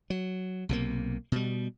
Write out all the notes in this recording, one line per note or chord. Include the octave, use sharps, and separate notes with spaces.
F#3
B1 C3 A#3
B2 G3